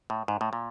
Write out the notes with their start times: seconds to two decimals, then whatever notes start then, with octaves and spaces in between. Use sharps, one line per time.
0.10 A2
0.28 G#2
0.41 A2
0.53 A#2